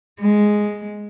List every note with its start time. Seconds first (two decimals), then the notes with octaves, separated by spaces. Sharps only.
0.20 G#3